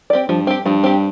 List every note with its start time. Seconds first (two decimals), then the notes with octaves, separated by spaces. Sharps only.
0.10 C4 G4 D5
0.29 G2 F3
0.47 C4 G4
0.65 G2 F3
0.84 C4 G4